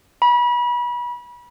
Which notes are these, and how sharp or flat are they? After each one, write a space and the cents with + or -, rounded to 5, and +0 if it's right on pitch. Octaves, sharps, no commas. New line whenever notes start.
B5 -30